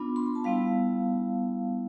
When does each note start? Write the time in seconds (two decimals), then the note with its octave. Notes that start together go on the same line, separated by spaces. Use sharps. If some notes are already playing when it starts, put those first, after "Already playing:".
Already playing: B3 D4 F4 B5
0.16 C6
0.26 B5
0.35 A5
0.44 G3 B3 E4 F5